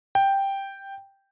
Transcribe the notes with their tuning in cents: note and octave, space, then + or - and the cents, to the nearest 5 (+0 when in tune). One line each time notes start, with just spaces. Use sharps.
G5 +0